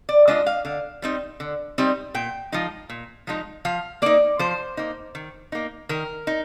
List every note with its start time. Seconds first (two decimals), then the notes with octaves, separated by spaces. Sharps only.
0.09 D5
0.28 G#3 D4 F4 D#5
0.46 F5
0.65 D3 F5
1.02 G3 C4 D#4
1.40 D3
1.78 G3 C4 D#4
2.14 A#2 G5
2.52 F3 G#3 D#4
2.89 A#2
3.27 F3 G#3 D#4
3.65 F3 F5
4.02 A#3 D#4 D5
4.39 F3 C5
4.77 A#3 D#4
5.15 D#3
5.52 A#3 D#4
5.89 D#3 A#4
6.27 D#4